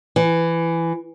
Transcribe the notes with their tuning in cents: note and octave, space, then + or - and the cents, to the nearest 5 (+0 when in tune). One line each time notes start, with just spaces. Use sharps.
E3 +15